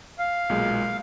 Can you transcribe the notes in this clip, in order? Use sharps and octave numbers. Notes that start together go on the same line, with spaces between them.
F5
B1 A#2 G#3